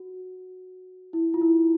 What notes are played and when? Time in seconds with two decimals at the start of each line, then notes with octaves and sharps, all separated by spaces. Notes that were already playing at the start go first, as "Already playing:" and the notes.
Already playing: F#4
1.13 E4
1.34 F4
1.41 E4